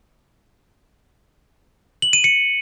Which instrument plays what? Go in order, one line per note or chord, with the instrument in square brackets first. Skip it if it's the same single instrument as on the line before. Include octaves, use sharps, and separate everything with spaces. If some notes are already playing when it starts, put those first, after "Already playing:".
[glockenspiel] F#7
D#7
C#7